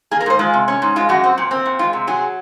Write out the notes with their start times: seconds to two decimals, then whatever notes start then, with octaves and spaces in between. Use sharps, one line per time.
0.11 A#3 G#4
0.21 A#4
0.26 G#2 C5
0.39 G#3 F4
0.54 C3
0.68 C#4
0.82 G#2
0.96 G#3 F4
1.09 F#2 F#4
1.24 C4
1.38 A#2
1.51 C4
1.66 A#2
1.79 G#3 F4
1.93 C3
2.07 F#3 G#4